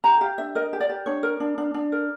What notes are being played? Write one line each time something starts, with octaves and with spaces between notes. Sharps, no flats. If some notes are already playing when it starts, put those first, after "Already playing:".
G4 A#5
G4 F5
D4 E5
A#4 D#5
G4
D5
G4
D4 C#5
A#4
D4
D4
D4
A#4